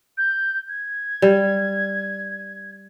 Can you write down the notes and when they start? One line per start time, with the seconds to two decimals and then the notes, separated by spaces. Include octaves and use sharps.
0.17 G6
0.68 G#6
1.22 G3